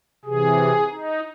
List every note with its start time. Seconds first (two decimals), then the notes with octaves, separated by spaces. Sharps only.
0.25 C3 E3 G#4
0.91 D#4